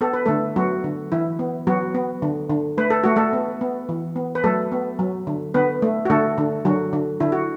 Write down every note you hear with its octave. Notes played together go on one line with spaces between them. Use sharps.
B3 A4
B4
D3 A3 A4
F#3 B3 F#4
D3
E3 E4
B3
F#3 B3 F#4
B3
D3
D3
A3 B4
A4
A3 F#4
A3 A4
B3
B3
E3
B3
B4
F#3 A3 A4
B3
F#3
D3
D3 B3 B4
A3
F#4
D3 A3 A4
D3
D3 F#3 F#4
D3
D3 E4
F#4